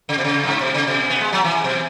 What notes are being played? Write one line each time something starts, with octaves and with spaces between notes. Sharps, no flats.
C#3
B2
C#3
F#2
G#2
B2
C#3
B2
B3
G#3
F#3
E3
B2